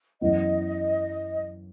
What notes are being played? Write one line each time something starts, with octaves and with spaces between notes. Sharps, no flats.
F#2 E3 B3 D#5